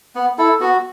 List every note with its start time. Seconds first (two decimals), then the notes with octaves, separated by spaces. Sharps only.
0.15 B3
0.38 E4 A4
0.60 B3 F#4